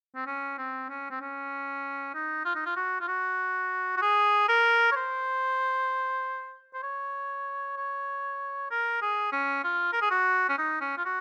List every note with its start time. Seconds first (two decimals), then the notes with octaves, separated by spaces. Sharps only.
0.15 C4
0.26 C#4
0.58 C4
0.89 C#4
1.10 C4
1.21 C#4
2.14 D#4
2.45 F4
2.55 D#4
2.66 F4
2.77 F#4
3.01 F4
3.08 F#4
3.97 F#4
4.02 G#4
4.48 A#4
4.92 C#5
4.96 C5
6.74 C5
6.83 C#5
7.77 C#5
8.71 A#4
9.02 G#4
9.32 C#4
9.64 F4
9.93 A#4
10.01 G#4
10.11 F#4
10.49 C#4
10.58 D#4
10.81 C#4
10.97 F4
11.05 F#4